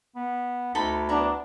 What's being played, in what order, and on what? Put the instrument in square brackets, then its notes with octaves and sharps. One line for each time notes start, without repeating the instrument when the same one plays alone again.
[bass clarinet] B3
[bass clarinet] D2 [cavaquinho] D#4 A4 B5
[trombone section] B3 D4 [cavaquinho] E4 A#5